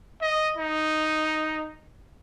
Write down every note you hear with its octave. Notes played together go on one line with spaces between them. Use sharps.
D#5
D#4